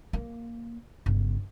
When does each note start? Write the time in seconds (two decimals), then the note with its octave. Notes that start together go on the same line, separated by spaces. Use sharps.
0.13 A#3
1.06 G1 C#3